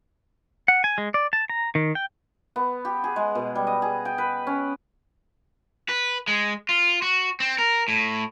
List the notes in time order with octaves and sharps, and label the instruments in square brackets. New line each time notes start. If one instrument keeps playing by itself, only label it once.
[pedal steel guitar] F#5
G#5
G#3
D5
A5
A#5
D#3
G5
[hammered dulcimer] B3
G4
G#4
G#3
B2
G3
D#5
G#4
G5
B4
C#4
[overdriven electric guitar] B4
G#3
F4
F#4
C4
A#4
A2